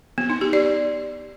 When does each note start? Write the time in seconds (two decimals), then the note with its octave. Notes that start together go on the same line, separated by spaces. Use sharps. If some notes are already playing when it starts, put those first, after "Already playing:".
0.18 B3
0.30 D#4
0.41 G4
0.53 D5